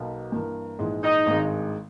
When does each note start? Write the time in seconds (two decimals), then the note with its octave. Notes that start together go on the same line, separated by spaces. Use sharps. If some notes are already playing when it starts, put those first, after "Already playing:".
Already playing: B1 B2 A#3
0.32 G2 E3 A#3
0.79 A#1 G#2 E3 G#3
1.03 D#4
1.26 G#1 G2 D#3 G#3